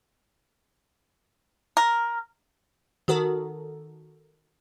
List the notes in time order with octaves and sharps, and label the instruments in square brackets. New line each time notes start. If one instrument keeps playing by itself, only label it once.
[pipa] A#4
[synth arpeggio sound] D#3 F#4 A4 A#4